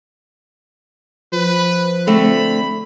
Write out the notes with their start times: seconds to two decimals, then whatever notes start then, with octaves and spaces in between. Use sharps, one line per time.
1.33 F3 B4
2.07 D3 A3 C4 B5